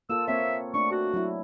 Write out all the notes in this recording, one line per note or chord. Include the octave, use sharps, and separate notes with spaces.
A#3 F4 A4 E6
A#3 C4 C#5 E5
A3 D4 C#6
F#4
F#3 E4